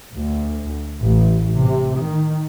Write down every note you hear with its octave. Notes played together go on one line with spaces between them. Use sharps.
D2
A1
C3
D#3